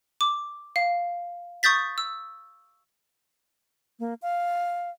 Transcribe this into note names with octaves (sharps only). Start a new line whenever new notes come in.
D6
F5
C#6 D#6 G6 A6 B6
E6
A#3
F5